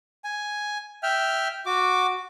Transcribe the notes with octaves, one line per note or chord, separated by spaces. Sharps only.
G#5
E5 G5 F6
F#4 D6